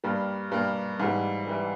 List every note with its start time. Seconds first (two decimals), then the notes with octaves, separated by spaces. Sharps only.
0.04 G2 G3 A#3
0.52 G2 G3 A#3
1.00 G#2 E3 G3
1.47 E3 G3